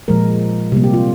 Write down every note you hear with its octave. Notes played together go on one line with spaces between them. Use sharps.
A#2 F3 G#3 A#4
C3 G3 A#3
G4
F4